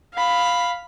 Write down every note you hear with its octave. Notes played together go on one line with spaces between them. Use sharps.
F5 B5